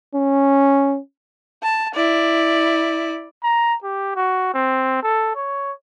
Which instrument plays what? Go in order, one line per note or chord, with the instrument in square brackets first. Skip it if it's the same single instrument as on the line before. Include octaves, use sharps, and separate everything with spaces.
[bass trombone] C#4
[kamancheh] A5
E4 D5
[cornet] A#5
G4
F#4
C4
A4
C#5